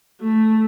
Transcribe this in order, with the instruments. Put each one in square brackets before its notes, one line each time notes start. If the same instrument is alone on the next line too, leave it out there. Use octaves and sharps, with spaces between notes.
[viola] A3